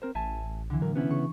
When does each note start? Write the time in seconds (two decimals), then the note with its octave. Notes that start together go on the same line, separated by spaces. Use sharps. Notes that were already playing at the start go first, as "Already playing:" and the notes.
0.02 C4 A#4 C5
0.15 A1 E5 G#5 A5
0.70 C2 D3 E3
0.82 A2 F#3 A#4
0.96 C3 B3 C#4 E4
1.11 C#3 C#6